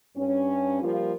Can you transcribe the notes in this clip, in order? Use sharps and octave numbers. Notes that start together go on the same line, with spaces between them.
G2 C#4
F3 G3 A#3 F4